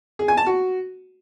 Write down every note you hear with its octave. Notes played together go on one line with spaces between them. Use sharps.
G#4
G#5
A5
F#4